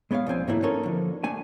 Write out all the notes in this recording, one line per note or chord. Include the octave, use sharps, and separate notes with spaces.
G#3 B3 C#5 D5 F5
C2 F3 C4 G#5
G#2 D3 E3 F#3 A#3 E4
C4 C#4 D#4 A4 A#4 C#5
D3 F3
A3 D4 G#5